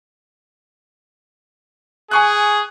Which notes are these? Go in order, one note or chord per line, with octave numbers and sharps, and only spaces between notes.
G#4 G#5 C#6 F#6